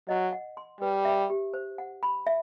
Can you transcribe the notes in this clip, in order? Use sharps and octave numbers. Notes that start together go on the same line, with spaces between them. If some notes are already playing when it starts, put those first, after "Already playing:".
F#3 D#5
F#5
C6
G3 B4
E5
G4
C5
F#5
B5
E5